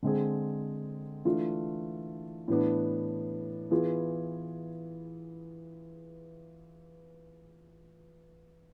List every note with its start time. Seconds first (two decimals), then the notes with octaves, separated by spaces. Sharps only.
0.03 D3 G#3 C4 G#4
1.25 E3 A3 D4 F4
2.48 A2 E3 B3 D4
3.71 E3 B3 F4 G#4